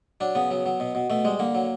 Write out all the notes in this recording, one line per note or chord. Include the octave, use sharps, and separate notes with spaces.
F#3 D4
C#3 B3
F#3
F#3
B2
B2
B2 A3
G3 G#3
D3 A#3
F#3